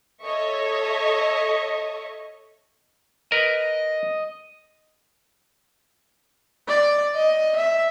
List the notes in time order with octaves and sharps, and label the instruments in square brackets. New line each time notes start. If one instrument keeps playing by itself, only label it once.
[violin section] A4 C#5 D#5 E5 C#6
[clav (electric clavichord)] A#4 B4 [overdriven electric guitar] D#5
[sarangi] D5
D#5
E5